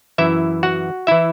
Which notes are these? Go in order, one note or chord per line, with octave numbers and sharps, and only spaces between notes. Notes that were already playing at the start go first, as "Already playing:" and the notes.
F#2 E3 E4 E5
F#4 F#5
E3 E4 E5